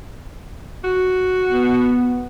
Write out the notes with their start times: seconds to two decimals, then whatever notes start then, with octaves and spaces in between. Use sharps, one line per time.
0.84 F#4
1.48 B3